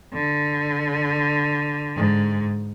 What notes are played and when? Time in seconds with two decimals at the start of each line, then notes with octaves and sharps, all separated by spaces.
0.13 D3
1.95 G#2